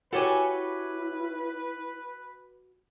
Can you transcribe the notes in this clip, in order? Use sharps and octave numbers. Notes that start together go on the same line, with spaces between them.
E4 F#4 G4 A4 B4 C#5 G#5